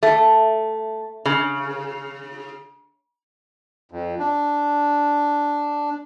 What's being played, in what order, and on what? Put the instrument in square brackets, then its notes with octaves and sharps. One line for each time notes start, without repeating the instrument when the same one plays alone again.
[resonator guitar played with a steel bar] A3
C#3
[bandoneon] F2
D4